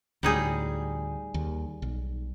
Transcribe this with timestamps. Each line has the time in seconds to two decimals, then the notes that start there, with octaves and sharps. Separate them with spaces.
0.23 D2 A2 G3 D#4 G#4
1.34 D#2
1.82 B1